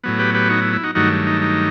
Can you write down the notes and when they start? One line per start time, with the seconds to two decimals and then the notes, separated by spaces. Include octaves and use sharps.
0.04 A2 F#3 B3
0.19 G4 B4
0.34 G4 B4
0.49 D#4 F#4
0.62 E4
0.73 E4
0.84 D#4 F#4
0.95 G2 D#3 F#3 A3 D#4 F#4
1.27 D#4
1.41 D#4